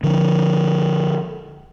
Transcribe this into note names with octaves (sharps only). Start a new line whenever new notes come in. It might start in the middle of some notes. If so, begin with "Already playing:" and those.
D3 F3